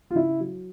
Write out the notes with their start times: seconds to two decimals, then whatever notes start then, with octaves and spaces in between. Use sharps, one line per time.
0.11 F4
0.15 C#3 E4
0.40 F#3